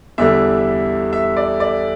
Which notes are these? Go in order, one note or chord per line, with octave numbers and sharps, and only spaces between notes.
E2 D3 G3 E5
E5
D5
D5